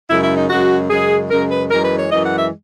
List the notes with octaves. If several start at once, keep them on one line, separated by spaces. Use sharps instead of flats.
F#2 C#3 G#3 E4
E4
D#4
F#2 C#3 G#3 F#4
F#2 C#3 G#3 G#4
F#2 C#3 G#3 A#4
B4
F#2 E3 G#3 A#4
B4
C#5
F#2 E3 G#3 D#5
F#5
E5